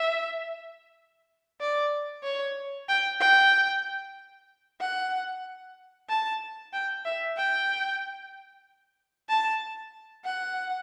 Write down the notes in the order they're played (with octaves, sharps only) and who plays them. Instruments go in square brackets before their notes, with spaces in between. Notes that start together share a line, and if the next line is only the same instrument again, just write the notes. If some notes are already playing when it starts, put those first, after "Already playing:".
Already playing: [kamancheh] E5
D5
C#5
G5
G5
F#5
A5
G5
E5
G5
A5
F#5